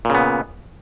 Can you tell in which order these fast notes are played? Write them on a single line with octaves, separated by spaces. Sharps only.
A#2 C#3 B3